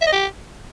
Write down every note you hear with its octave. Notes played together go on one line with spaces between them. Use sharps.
E5
D#5
G4